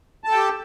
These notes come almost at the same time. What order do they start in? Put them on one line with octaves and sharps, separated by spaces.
A5 A4 G5 G4